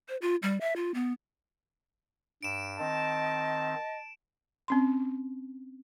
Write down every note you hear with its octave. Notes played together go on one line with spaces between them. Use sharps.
C5
F4
G3
E5
F4
B3
G2 D7 E7
D#3 C4 D#5 A5
C4 C#4 C6